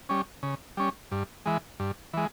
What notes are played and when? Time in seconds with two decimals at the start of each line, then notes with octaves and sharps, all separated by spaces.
0.09 G3 C#4
0.43 C#3
0.77 G3 C#4
1.12 G2
1.46 E3 G#3
1.80 G2
2.13 E3 G#3